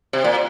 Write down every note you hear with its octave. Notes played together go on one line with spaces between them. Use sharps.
C3
A#2